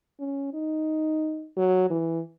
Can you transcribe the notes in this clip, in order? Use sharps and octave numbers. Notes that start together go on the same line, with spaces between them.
C#4
D#4
F#3
E3